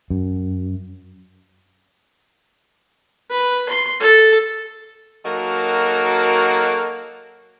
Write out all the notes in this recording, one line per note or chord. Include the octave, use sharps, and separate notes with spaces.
F#2
B4
C6
A4
F#3 A#3 D#4 F#4 A4 A#4